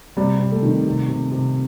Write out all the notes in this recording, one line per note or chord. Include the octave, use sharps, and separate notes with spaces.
C3 G3
C3
A3
D#3
C3
C3
C3